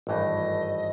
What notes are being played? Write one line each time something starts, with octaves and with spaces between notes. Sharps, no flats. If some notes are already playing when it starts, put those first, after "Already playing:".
G#1 G2 E3 A3 D#5